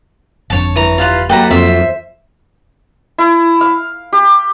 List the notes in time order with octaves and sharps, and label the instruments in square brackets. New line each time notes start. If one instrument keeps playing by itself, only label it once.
[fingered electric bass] G1 F2 D4 [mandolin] C#5 A5
[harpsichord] E3 A#5
[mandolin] F4 G4 B4
[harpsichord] F#2 [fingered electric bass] A#3 [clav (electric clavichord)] G4 [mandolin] A4 B4 A#5
[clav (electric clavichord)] F2 [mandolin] C5 E5
[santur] E4
F5
G4